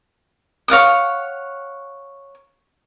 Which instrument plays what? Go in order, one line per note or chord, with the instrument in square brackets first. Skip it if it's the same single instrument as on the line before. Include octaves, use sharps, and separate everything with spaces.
[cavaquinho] C#5 F5 F#5 D#6